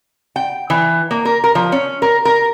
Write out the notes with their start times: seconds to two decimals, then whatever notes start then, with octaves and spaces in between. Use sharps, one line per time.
0.36 G5
0.70 E3
1.11 A#3
1.25 A#4
1.44 A#4
1.55 F3
1.72 C#4
2.02 A#4
2.25 A#4